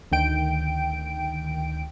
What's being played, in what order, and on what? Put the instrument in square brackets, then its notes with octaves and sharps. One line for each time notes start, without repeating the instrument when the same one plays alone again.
[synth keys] D2 D#3 G5 D7